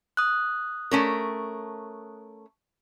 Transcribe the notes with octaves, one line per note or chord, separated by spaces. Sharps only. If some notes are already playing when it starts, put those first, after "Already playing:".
D#6 F#6
A3 C#4 A#4